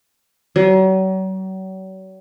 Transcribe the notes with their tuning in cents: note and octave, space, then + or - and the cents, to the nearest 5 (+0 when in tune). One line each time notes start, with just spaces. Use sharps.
F#3 +40